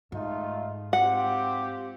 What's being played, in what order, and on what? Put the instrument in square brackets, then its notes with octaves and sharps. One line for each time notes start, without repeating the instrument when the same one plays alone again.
[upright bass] G#2 [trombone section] A3 D#4 F4
[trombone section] C4 F4 G4 [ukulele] F#5